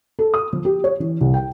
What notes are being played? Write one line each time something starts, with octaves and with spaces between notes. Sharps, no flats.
A4
D#6
F3
G4
C#5
E3
C2
G5